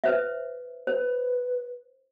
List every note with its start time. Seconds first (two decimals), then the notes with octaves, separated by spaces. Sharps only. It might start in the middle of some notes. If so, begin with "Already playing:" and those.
0.04 B4 C5 E5
0.87 B4 C5